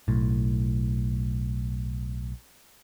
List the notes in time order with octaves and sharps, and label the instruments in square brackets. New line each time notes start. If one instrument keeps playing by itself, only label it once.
[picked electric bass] B1 A2